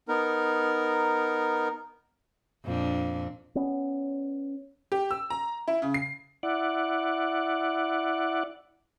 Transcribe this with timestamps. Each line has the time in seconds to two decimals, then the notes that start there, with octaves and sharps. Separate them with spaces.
0.08 B3 D#4 A#4
2.65 F2 A#2 D4
3.55 B3 C#4
4.92 G4
5.11 E6
5.30 A#5
5.68 E4
5.82 C#3
5.94 C7
6.43 E4 D5 F#5